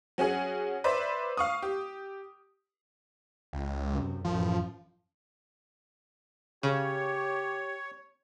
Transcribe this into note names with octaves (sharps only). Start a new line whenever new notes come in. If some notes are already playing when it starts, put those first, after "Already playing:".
F#3 C#4 F#4 G#4
B4 C5 D5 E5
F5 C#6 D#6
G4
C#2
F#2 C3
A1 F#2 F3
C#3 G4 C#5